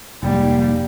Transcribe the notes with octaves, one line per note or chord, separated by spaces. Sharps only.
F1 G#2 G3 A#3